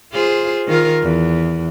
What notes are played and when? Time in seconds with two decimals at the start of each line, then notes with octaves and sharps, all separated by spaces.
0.13 F4 G#4 C5
0.67 D#3 F4 A#4
1.02 E2